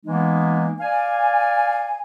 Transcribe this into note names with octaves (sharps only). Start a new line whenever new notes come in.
E3 G#3 A#3 B3 D#4
D5 F5 G#5